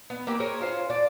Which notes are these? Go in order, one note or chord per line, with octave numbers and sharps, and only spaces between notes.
B3
A#3 C4 G4
G#4 A#4 C5 C#5
C#4 F4 C5
D5 A5